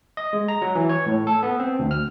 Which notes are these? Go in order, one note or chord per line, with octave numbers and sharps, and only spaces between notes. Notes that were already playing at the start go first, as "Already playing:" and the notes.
D#5
G#3
A#5
F#3
E3
C#5
A2
A4
B3
C4
D2
F6